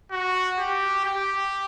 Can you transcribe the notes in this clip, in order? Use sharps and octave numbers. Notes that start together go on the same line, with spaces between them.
F#4
G4
G4